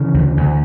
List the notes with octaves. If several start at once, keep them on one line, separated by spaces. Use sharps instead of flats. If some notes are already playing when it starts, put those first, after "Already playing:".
Already playing: C#3 E3
D2
D2